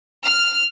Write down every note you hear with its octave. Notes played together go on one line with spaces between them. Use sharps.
F6